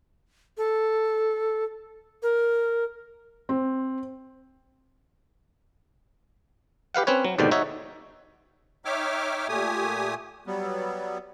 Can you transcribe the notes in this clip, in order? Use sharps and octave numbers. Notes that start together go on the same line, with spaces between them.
A4
A#4
C4
G4 B4 F5 F#5
C4 C#4 B4 C#5
F#3
D#2 G#2 B2 D3 D5 G5
D#4 F#4 C#5 E5
D#4 C#5 E5 G5 D6 F6
A#2 A3 G4 G#5 D#6
F#3 G3 B3